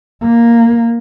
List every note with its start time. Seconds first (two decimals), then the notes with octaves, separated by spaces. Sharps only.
0.22 A#3